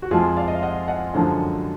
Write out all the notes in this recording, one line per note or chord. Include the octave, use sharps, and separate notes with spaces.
F#4
F2 F3 G#3 F4 G#4
D5 F5
D#5
F5
D#5 F#5
D#5 F#5
F#2 D3 F3 G#3